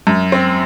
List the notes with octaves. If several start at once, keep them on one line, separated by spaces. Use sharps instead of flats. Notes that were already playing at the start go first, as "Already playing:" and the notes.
F#2
C4